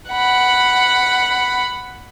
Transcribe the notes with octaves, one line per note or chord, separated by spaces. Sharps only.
F#5 B5